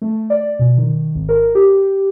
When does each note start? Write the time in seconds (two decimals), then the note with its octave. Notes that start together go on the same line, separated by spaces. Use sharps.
0.02 A3
0.30 D5
0.59 B2
0.78 D#3
1.15 G#1
1.29 A#4
1.55 G4